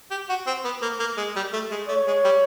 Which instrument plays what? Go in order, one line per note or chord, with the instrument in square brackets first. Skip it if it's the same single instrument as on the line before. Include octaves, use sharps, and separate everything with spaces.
[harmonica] G4
F#4
C4
B3
A#3
A#3
G#3
G3
A3
G#3
[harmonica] A3 [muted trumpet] C#5
[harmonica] G#3
G3